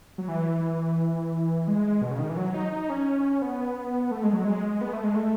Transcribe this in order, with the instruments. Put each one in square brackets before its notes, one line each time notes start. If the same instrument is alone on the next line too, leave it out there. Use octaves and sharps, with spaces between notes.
[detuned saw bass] F#3
E3
G#3
B2
C#3
D#3
E3
F#3
D#4
D#4
C#4
B3
A3
G#3
F#3
G#3
B3
A3
G#3
A3